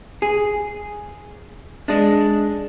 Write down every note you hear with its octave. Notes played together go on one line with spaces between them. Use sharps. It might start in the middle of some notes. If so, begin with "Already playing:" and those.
G#4
G#3 D4